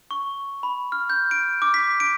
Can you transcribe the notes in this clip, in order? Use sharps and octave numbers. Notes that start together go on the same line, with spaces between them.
C#6
B5
F6
G6
D7
D6
B6
D7